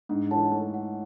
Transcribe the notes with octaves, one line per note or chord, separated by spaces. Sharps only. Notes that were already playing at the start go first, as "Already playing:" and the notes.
G#2 D4
E3 A4 C#5 F#5 A5
A3 A4
C#5 F#5